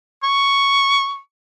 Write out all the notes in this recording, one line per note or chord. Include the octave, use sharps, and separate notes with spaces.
C#6